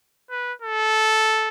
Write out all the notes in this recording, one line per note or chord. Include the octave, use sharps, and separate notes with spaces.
B4
A4